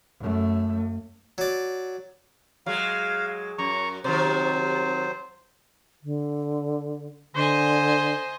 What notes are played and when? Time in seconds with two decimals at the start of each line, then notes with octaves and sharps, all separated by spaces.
0.20 F#2 A3
1.38 F#3 D5
2.66 F#3 G#3 F5
3.58 F#2 A#5 C#6
4.04 C3 D#3 F#3 C5
6.03 D3
7.34 D3 C5 D#5 G#5